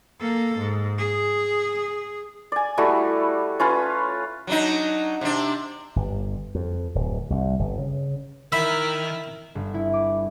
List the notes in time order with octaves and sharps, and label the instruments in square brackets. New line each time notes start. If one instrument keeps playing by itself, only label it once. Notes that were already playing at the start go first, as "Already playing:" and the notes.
[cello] A#3 A4
G#2
G#4
[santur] D5 G#5
G3 A3 E4 F#4
C#4 F4 B4 C#5
[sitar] F#3 D4 D#4
C3 D4
[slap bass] G1
F2
D1
C2
G1
C#3
[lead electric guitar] D#3 [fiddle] E4 [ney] A#4 [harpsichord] E5 B5
[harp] G1
E4
D6